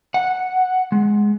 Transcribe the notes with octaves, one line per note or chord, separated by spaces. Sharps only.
F#5
G#3